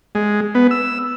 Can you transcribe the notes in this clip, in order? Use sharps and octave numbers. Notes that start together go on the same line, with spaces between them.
G#3
B3
E6